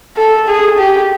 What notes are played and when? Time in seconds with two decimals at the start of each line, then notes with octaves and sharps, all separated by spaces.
0.17 A4
0.48 G#4
0.78 G4